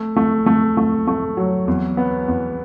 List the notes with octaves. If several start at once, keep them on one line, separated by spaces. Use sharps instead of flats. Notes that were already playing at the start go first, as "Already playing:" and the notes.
Already playing: A3
A3
A3
A3
A3
F#3
E2
B3
E2